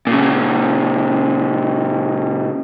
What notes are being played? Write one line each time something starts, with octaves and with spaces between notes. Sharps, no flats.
A#2 C#3